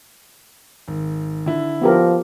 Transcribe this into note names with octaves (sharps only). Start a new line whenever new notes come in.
G#1
D3 E4
F3 B3 G4 A#4